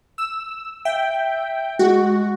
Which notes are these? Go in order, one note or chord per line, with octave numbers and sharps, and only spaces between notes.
E6
E5 G5
G#3 F#4